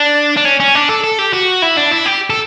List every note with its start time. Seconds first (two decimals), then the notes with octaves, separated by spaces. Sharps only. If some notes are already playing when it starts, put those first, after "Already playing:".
Already playing: D4
0.37 D4
0.45 C#4
0.60 C#4
0.75 D4
0.89 A4
1.04 A4
1.18 G4
1.33 F#4
1.62 E4
1.77 D4
1.91 E4
2.06 G4
2.30 A4